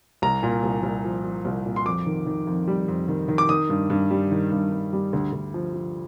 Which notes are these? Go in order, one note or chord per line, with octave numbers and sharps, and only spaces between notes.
C2 A#5
A#2
C2
C2
F3
F3
C2
A#2
C6
F2 D6
D#3
D#3
F2
G3
F2
D#3
D#3
D6
D#3 D#6
G2
G2
G3
D#3
G2
G2
G3
D2
D2
F3
F3